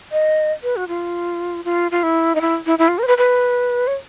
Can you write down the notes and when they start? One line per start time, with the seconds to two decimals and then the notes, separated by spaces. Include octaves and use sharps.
0.12 D#5
0.63 B4
0.76 F#4
0.88 F4
1.65 F4
1.91 F4
2.03 E4
2.35 D#4
2.41 E4
2.66 E4
2.79 E4
2.88 F4
2.98 A#4
3.03 C5
3.07 B4
3.18 B4
3.87 C#5